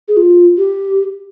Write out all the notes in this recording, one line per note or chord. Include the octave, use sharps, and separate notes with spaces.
G#4
F4
G4